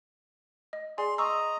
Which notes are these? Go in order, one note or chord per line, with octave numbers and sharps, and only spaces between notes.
D#5
G#4 D5 G#5 C6
D#5 A#5 C6 C#6 E6